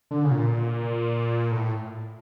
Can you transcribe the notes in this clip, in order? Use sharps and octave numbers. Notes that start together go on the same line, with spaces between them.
D3
C#3
A#2
A2